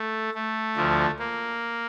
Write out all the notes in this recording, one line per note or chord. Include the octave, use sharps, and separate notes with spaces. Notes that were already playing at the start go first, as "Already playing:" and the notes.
Already playing: A3
A3
D2 D3 F3
A#3